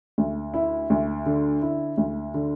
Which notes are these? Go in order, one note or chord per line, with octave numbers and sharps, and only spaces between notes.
D2
E4
D2
D3
E4
D2
D3